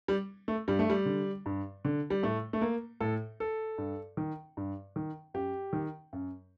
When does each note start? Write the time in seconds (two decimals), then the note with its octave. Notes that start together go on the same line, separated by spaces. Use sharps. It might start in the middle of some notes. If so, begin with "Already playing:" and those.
0.08 G3
0.48 A3
0.68 G2 G3
0.79 A3
0.90 G3
1.06 D3
1.46 G2
1.85 D3
2.10 G3
2.23 A2 A3
2.53 A3
2.61 A#3
3.00 A2 A4
3.40 A4
3.78 G2
4.17 D#3
4.57 G2
4.96 D#3
5.34 F#2 G4
5.73 D#3
6.13 F#2